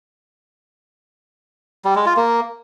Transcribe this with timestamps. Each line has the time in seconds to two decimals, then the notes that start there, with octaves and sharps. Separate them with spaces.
1.85 G3
1.96 G#3
2.06 F4
2.17 A#3